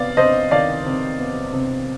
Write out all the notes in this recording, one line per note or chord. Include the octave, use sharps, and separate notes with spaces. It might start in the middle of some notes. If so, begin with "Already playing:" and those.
Already playing: C3 B3 D5 F5
C3 C5 D#5
D#3 D5 F5
C3
B3
C3